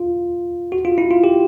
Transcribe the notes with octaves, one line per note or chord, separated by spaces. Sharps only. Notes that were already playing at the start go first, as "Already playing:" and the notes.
Already playing: F4
F#4
F4
E4
F4
G4